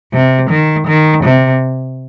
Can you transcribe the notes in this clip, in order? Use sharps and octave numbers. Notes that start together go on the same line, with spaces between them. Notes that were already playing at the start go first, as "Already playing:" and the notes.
C3
D#3
D#3
C3